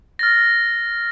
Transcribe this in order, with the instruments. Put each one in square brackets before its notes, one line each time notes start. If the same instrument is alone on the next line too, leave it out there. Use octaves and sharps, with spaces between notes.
[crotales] F6 A6 A#6